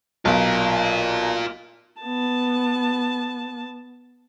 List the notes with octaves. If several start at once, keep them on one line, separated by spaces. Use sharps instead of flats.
B1 F4 A#4
B3 A5